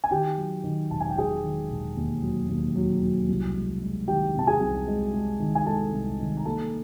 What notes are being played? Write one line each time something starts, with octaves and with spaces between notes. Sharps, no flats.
G#5
D#3 G4 G5
F#3
D#3
E1 A5
G#5
G5
E1 G#4 G#5
D#3
E1
D#2
F#3
D#2
F#3
F#3
C2
G#3
G#3
D#3 G4 G5
C3 A5
G#4 G#5
C2
G#3
G#3
D#3
G#5
G#3 A4 A5
C2
D#3
A#5
A#3 A4 A5